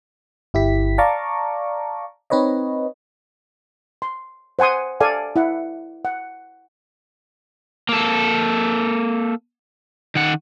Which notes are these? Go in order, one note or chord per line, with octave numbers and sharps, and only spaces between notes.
G1 E4 G4 B6
D5 F5 A5 A#5 C#6 D6
C4 D#4 B4 C#5 D#5
C6
C5 F#5 G#5 C6 D#6
A4 D5 F5 G#5
E4 F#5
F#5
A#3 A4
D#3 F#5